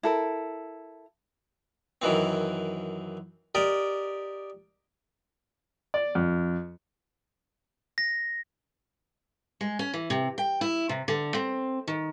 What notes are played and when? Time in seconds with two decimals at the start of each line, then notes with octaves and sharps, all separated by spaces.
0.03 E4 A4 A#4
2.02 F#2 D#3 E3 C4
3.55 G4 A#4 D5 D#5
5.94 D5
6.15 F2
7.98 A#6
9.61 G#3
9.79 C#4
9.94 E3
10.10 C3
10.38 G5
10.61 E4
10.89 C3
11.08 D3
11.34 C4
11.88 D#3